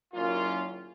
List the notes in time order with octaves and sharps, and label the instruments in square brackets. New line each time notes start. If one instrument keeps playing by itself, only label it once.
[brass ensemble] F#1 F#2 A#2 D#3 C#4 F4